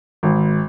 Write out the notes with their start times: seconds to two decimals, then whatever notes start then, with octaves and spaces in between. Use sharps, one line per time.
0.23 G#1